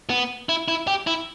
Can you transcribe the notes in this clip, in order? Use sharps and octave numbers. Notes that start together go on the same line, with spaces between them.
B3
E4
E4
G4
E4